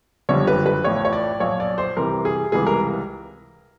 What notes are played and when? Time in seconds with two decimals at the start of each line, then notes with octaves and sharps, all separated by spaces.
0.29 F#1 F2 D3 G3 C#5
0.47 B4
0.66 B4
0.84 A1 A2 F3 C#5
1.05 C#5
1.13 D5
1.40 B1 A#2 F3 C#5
1.60 D5
1.78 C5
1.97 C2 C3 E3 A#4
2.25 G#4
2.52 C#2 C3 E3 G3 G#4
2.67 A#4